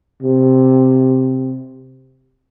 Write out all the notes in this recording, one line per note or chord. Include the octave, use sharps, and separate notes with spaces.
C3